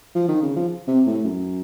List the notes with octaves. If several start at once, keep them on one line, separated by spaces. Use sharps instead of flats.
F3
D#3
C#3
F3
C3
A2
F#2